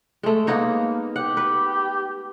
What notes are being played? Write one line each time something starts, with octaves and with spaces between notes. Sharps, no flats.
G#3 A3
A#3 B3 D#4 C#5
G4 F#5
B4